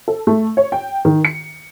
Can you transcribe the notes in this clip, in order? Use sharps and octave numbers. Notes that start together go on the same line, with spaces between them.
A4
A3
C#5
G5
D#3
C#7